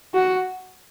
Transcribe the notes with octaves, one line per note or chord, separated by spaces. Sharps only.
F#4